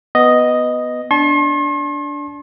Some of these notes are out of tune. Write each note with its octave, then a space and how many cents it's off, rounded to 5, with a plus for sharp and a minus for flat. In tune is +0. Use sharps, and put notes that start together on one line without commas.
B3 +0 D#5 +0
D4 -15 A5 -30 C6 +45